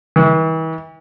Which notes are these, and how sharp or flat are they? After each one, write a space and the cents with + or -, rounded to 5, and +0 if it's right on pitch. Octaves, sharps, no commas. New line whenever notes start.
E3 -40